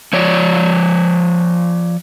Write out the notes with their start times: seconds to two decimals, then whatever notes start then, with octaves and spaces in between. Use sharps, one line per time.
0.13 F3 C#5 D5